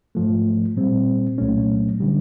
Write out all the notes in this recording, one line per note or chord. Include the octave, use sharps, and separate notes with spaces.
G#2 F3 A3
A#2 G3 C4
C2 A#2 F#3 A3 C#4
D3 G3